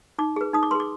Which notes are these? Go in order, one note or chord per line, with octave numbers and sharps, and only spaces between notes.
D#4 D6
G#4 B4
D#4 D#6
D6
G#4 B4 C6
D6